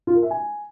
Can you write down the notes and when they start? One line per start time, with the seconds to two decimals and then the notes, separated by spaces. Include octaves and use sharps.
0.07 F4
0.15 A#4
0.23 E5
0.31 G#5